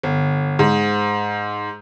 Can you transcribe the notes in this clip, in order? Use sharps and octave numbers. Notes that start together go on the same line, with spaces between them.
G1
G#2